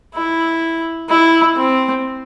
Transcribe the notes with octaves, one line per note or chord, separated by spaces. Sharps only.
E4
E4
C4